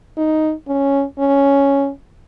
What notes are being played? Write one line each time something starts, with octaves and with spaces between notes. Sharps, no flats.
D#4
C#4
C#4